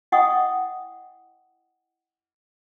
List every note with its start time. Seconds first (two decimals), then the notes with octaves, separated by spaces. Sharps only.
0.12 E4 D#5 F#5 G5 C#6 D#6